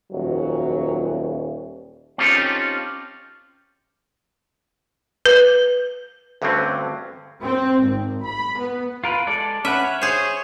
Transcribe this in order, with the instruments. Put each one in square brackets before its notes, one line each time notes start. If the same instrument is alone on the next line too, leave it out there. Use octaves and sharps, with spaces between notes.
[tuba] D#1 [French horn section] F2 F#3
[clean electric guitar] C4 C#4 D#4 F4 G4 A4
[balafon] B4
[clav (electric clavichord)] D2 G2 D3 F#3 C4 C#4
[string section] C4
G#1
B5
B3
[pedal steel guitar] F4 A#4 B4
G#3 A4 D5
[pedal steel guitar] C#4 B4 F#5 [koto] E5
[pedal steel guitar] C#5
[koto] G#4 C5